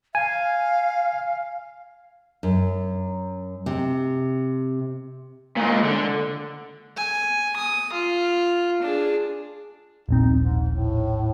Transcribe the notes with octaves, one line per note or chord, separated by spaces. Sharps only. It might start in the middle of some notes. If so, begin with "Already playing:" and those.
F5 G#5
F#2
C3
A#2 G#3
D3
G#5
D#6
F4
D4 G#4
D#1 A#1 C4 D#4
G#2
A2